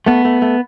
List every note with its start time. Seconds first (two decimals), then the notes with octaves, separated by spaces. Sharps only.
0.06 A3 B3
0.25 A3
0.42 A3